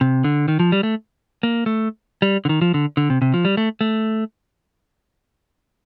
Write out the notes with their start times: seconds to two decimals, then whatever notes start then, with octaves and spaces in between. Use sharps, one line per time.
0.01 C3
0.24 D3
0.48 D#3
0.60 F3
0.72 G3
0.83 A3
1.43 A#3
1.66 A3
2.22 G3
2.45 D3
2.49 D#3
2.61 F3
2.74 D3
2.97 D3
3.10 C3
3.22 C3
3.34 F3
3.45 G3
3.57 A3
3.81 A3